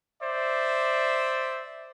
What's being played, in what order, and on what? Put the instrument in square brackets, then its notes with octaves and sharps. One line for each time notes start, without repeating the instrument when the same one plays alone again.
[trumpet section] C5 D5 E5